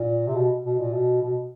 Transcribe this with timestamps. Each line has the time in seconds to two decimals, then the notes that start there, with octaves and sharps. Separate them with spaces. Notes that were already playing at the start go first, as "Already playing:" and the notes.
Already playing: A#2
0.27 C3
0.35 B2
0.65 B2
0.79 A#2
0.93 B2
1.22 B2